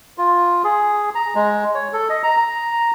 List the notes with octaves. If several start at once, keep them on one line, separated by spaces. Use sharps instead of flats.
F4
G#4
A#5
G#3
C#5
A4
D#5
A#5
A#5